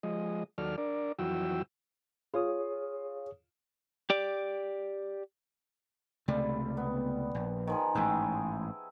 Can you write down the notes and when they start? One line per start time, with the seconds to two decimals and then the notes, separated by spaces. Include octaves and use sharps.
0.03 F3 G#3 D#5
0.58 D#2 F#3 A4 D5 F6
0.78 D4 A#4 D5
1.19 F2 E3 F#3 F#4 G5 E6
2.34 F4 G#4 C#5 D#6
4.10 G4 D5
6.28 C#2 C3 G3 A3
6.77 B3
7.35 A#1
7.67 D#3 F3 G#4
7.95 A1 G#2 G#4 E5 G5